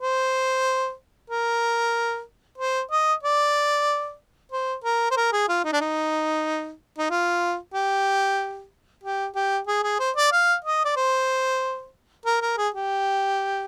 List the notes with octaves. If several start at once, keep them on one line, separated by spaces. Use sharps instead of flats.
C5
A#4
C5
D#5
D5
C5
A#4
C5
A#4
G#4
F4
D#4
D4
D#4
D#4
F4
G4
G4
G4
G#4
G#4
C5
D5
F5
D#5
D5
C5
A#4
A#4
G#4
G4